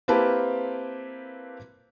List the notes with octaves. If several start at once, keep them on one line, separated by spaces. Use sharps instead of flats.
A#3 C4 E4 G4 B4 A5